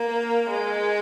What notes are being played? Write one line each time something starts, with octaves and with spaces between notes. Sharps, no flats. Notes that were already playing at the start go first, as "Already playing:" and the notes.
Already playing: A#3
G#3